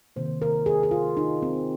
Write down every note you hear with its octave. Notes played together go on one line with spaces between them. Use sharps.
C3 D#3 A#3 C5
A#4
G#4
G#4
F4
D#4
C4